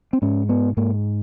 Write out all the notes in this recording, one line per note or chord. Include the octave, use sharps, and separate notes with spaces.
C4
G#2 C#4
B3
G#2 A#3